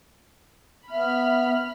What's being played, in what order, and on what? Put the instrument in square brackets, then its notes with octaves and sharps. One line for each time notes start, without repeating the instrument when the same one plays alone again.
[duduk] B3 [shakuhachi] E5 [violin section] B5 F6